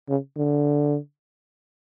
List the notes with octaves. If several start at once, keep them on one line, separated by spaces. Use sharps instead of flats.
C#3
D3